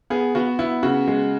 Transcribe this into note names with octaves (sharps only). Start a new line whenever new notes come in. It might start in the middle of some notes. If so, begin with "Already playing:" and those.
B3 G#4
B3 F#4
B3 E4
C#3 F#4
G#3